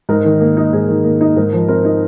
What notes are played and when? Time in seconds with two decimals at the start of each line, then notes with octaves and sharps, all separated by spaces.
0.09 G#2 A#4
0.25 D#3
0.40 A#3
0.57 D#4
0.73 G#2 G#4
0.88 D#3
1.05 A#3
1.21 D#4
1.36 G#2 A#4
1.53 F3
1.68 C4 A#4
1.85 D#4